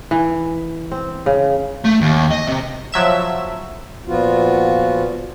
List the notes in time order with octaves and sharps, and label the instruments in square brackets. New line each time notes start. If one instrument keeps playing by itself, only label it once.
[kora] E3
C4
C#3
[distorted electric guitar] A3
D#2
D#5
C3
[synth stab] F3 F#3 E5 E7
[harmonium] A#2 F3 B3 F4 F#4